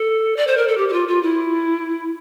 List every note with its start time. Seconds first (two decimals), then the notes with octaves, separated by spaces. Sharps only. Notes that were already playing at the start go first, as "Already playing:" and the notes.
Already playing: A4
0.36 D5
0.47 C5
0.57 A#4
0.68 A4
0.77 G4
0.89 G4
0.93 F4
1.08 F4
1.23 E4